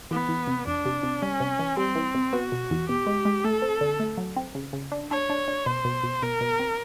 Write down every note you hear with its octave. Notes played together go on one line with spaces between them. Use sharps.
E3 B3
E3
C3
F2 D4
C3
C3
G3 C#4
C3
E3
G3 C4
E3
C3
B3 F#4
B2
E2
B2 G4
G#3
G#3
A3 A4
C4
D3
A3
F#3
C4
C#3
C#3
D4
D4 C#5
D4
D4
B2 C5
B2
B2
B2 A#4
B2
C4